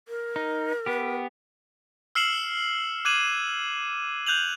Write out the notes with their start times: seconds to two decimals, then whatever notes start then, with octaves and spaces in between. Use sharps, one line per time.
0.08 A#4
0.36 D#4
0.86 B3 G4
2.15 E6 F6 C7 C#7 E7 F#7
3.05 D6 F#6 G#6 D#7 E7 F#7
4.27 F#6 G6 F7 F#7